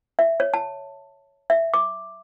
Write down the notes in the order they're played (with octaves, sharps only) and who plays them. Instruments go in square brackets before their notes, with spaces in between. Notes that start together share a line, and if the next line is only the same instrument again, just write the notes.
[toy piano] E5
C#5
A5
E5
D6